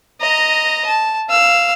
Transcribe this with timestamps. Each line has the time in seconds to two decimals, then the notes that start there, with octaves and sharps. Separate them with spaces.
0.21 D#5 A#5
0.87 A5
1.29 F5 E6